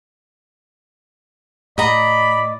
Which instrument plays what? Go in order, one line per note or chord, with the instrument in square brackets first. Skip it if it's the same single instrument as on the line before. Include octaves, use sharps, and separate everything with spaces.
[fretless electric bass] A2 [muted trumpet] D5 [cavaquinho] D#5 A#5 [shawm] B5